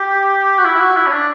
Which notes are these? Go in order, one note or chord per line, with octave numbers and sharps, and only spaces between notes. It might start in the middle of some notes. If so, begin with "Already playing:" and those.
Already playing: G4
F#4
E4
E4
F#4
E4
C#4
D4